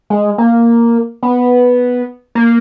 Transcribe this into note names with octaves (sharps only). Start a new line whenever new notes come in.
G#3
A#3
B3
A#3